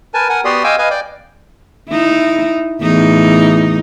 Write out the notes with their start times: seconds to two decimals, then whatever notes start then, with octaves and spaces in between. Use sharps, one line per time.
0.14 A#4 B4 G#5 A5
0.29 A#4 F#5 G#5
0.45 B3 F#4 G4 D5 C6 D#6
0.64 D#5 F5 G5 G#5 D6 E6
0.78 B4 D#5 F5 G#5
0.91 D5 G5 D6
1.89 D#4 E4
2.81 E2 A2 D#4